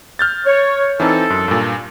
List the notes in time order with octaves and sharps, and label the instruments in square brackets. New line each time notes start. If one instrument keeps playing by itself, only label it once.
[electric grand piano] F6 G6 A6
[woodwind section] C#5
[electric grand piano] E3 C4 D#4 [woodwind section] A4
[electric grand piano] F#2
G2 A#2